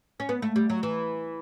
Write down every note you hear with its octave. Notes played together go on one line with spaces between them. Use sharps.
C#4
B3
A3
G3
F#3
E3